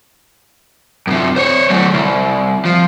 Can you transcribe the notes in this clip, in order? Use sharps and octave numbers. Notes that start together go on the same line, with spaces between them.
F#2 C3
C5 C#5
F#3 A3
C2
F3